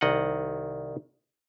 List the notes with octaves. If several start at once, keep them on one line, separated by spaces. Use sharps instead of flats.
C2 D#3 D#5 F#5